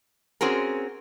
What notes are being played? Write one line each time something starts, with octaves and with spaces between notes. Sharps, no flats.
C4 C#4 F#4 G#4 A#4